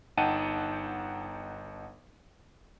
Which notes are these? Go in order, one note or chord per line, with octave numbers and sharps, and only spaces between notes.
G1 D#4 F#5 G5 A5 D#7